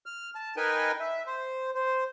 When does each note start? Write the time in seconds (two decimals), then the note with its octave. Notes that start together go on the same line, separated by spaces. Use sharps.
0.06 F6
0.35 A5
0.57 D#4 A#4 B4 G5 G#5
1.00 E5
1.27 C5
1.75 C5